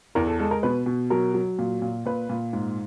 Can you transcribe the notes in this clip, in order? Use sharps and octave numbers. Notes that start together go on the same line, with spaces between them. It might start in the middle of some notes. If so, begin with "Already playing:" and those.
E2 A#4
A4
G#3 A4
A#4
B2 B4
B2
F#3 A#4
F#3
A#2
A#2
A#2 B4
A#2
G#2